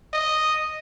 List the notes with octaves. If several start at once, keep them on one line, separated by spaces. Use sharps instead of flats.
D#5